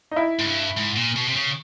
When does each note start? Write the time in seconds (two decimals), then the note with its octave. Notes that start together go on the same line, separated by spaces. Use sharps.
0.11 D#4
0.16 E4
0.40 G#2
0.47 G2
0.77 G#2
0.96 A#2
1.16 B2
1.28 C3
1.36 C#3